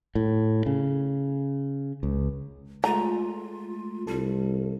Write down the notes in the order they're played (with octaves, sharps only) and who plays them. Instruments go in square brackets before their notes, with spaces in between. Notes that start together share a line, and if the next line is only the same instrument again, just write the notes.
[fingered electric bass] A2
C#3
C#2
[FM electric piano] G#3 A3 [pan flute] F4 [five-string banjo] A#5
[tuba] C2 [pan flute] G3 [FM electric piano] A4